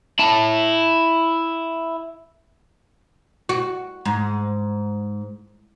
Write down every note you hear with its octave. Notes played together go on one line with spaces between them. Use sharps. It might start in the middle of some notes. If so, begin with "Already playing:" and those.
E4 A5
F#4
G#2